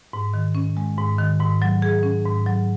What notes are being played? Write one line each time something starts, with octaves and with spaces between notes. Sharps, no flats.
G#2
D#3
C#4
G#3
G#2
D#3
G#2
F#3
G#4
C#4
G#2
F#3